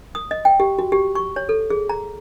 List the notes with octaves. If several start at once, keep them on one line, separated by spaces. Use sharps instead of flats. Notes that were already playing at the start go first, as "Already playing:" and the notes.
D#6
D#5
G5
G4
F#4
G4
C#6
C#5
A4
G#4
A#5